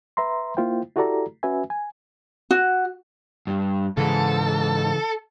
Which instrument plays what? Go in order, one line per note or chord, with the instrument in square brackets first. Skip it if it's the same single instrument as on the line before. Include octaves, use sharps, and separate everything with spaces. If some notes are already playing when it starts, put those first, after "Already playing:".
[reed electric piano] B4 E5 A#5 C6
A#3 E4 F4 C5 G5
E4 F#4 G4 A4 D5 A#5
C#4 F#4 B4 E5 G#5
G#5
[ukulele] F#4
[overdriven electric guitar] G2
[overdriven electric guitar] G#2 [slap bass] C#3 E3 [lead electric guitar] A4